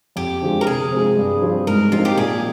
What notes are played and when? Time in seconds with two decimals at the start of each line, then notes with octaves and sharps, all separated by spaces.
0.16 F2 G4
0.42 D3 F3 G#3
0.61 A#4
0.66 C3 G#4
0.92 F3 G#3 C4
1.17 G2
1.42 F3 C4
1.67 G#2 A#4
1.92 F3 C4 D#4 F4
2.05 G4
2.17 A#2 G#4